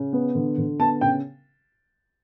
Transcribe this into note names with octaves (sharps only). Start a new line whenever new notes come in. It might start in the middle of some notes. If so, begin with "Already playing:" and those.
Already playing: C#3
B3
D3
D3
B3 A5
C#3 G5